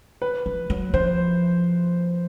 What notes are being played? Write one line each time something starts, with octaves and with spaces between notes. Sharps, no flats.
B4
F3
F#3
F3 C5